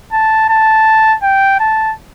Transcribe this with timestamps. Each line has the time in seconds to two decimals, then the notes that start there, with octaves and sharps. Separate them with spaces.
0.13 A5
0.50 A5
1.23 G5
1.60 A5